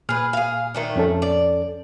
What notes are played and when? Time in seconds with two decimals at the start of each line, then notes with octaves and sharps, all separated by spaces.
0.09 A#2 G#4 B4 F6
0.33 G#4 F5
0.74 D#3 A3 D4
0.96 F2 C#4 A4
1.22 D5